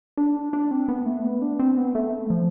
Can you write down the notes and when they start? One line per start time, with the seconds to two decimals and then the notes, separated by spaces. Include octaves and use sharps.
0.18 D4
0.53 D4
0.71 C4
0.88 B3
1.06 A3
1.25 B3
1.42 D4
1.59 C4
1.77 B3
1.95 A3
2.30 F3